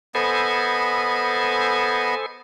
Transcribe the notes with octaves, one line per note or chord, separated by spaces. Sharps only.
B3 A4 C5 D#5 G#5 B5